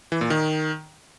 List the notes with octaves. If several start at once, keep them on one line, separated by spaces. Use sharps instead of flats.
E3
A#2
D#3